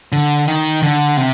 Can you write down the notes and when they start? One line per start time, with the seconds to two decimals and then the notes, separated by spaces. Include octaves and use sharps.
0.12 D3
0.48 D#3
0.83 D3
1.17 C3